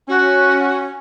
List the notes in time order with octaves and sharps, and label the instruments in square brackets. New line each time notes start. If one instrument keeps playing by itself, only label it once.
[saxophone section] C#4 [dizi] F#4